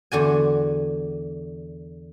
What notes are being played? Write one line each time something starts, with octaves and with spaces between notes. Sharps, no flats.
E2 D3 F#4 G#5